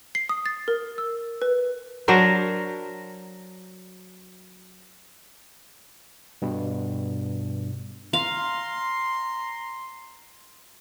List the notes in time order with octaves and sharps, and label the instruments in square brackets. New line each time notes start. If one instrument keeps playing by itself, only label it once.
[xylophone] C7
D#6
A6
A#4
E6
B4
[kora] F#3 D4 A#4 C5
[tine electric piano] G2 B2
[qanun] F5 [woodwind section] A#5 C6